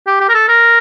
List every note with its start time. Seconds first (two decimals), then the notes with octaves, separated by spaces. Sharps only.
0.07 G4
0.20 G4
0.29 A#4
0.34 A4
0.48 A#4